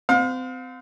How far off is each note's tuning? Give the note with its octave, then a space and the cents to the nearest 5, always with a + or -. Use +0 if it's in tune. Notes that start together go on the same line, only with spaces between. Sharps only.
C4 -30 F5 +35